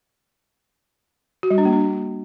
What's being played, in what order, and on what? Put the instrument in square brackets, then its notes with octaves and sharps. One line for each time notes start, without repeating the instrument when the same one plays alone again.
[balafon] F#4
G3
D4
A#3
D4